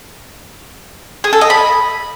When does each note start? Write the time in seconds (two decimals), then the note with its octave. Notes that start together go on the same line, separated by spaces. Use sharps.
1.24 G#4
1.33 A4
1.41 D#5
1.50 B5